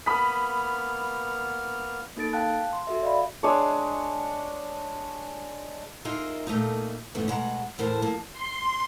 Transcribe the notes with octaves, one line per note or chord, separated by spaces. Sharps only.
A#3 B3 B5 D#6 F6 B6
A#3 D#4 A4 A6 D7
F5 G5 A5 F#6
C6
F#4 A4 E5
D5 D#5 F5 B5
G#3 D4 C#5
D#4 F4 G#4 A#4 D#5 E5
A#2 A3 A#3 D#4
E2 G#2 C#3 A3 B3
B2 G#3 F#5 A#5
E2 A2 A#4 C5 A5
F3 A#3
C6